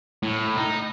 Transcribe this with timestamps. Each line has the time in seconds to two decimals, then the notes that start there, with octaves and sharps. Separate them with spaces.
0.23 A2
0.57 D#4